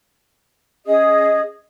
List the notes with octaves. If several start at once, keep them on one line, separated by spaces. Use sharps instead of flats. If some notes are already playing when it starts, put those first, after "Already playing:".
C#4 G#4 D#5 D#6